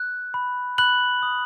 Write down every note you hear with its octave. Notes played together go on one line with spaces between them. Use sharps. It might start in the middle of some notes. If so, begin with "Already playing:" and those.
Already playing: F#6
B5
B5 F#6 F#7
D#6